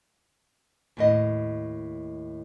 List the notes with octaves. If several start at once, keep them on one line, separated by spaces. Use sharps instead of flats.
D#2 A2 D#5